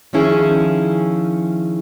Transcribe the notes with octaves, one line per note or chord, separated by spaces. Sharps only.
D#3 F3 C#4 E4 G#4